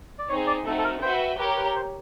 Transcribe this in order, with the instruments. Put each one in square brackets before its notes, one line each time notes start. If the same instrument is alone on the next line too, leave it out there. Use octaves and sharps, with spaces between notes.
[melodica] D5
[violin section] C4 D#4 G#4 [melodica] C#5
[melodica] D5
[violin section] A3 C4 D#4 F#4 [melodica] A4
[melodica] A4
A#4
[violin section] F#4 B4 E5 G5 [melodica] C5
[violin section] G4 A#4 C#5 [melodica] B4
[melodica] B4
C5